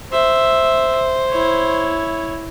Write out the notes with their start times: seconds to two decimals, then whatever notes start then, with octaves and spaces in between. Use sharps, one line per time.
0.12 C5 E5
1.29 E4 C#5